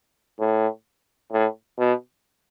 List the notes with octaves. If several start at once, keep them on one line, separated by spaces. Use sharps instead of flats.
A2
A2
B2